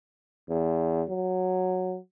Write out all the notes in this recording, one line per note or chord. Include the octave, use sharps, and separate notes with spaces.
E2
F#3